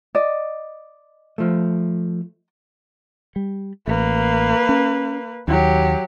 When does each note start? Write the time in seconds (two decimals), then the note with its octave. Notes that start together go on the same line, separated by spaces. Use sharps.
0.15 D5 D#5
1.38 F3 A3
3.36 G3
3.87 A1 A#3 B4
4.69 C#4
5.48 D#2 F#3 G4